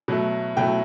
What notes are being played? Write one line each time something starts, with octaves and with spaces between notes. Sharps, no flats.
B2 F#3 A3
B2 F#3 A3 G5